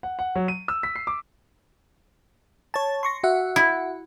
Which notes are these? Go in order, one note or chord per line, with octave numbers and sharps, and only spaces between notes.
F#5
F#5
F#3
D#7
E6
B6
C7
D6
C#5 A5
C6 C#6 A#6
F#4 E5 F#5
E4